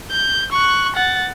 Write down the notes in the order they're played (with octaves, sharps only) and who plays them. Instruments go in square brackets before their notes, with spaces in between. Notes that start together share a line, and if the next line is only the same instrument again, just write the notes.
[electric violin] G6
C#6 F#6
F#5 A6